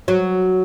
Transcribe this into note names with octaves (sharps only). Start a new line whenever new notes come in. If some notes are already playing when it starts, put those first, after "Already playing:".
F#3